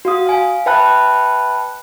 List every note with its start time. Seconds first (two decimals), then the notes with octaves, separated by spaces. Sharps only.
0.05 F#4 F5 D#6
0.27 F5 G#5
0.66 B4 E5 G5 A5 B5 F#6